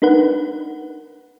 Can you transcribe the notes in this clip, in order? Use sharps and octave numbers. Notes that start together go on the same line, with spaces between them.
D4 D#4 A#4 B4 F#5